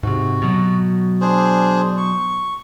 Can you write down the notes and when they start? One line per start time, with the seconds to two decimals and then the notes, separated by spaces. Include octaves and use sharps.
0.03 G#2 C3 F#4
0.42 B2 F#3
1.21 D4 G#4 C5
1.97 C#6